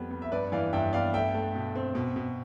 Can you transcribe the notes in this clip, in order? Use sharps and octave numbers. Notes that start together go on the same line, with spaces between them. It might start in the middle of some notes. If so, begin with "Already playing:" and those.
Already playing: F2 G3 B3
B3
E5
G2 B4 D5
E3 D5 F5
G2 E5 G5
B3 D5 F5
A3 E5 G5
A3
B2
C4
B2
B2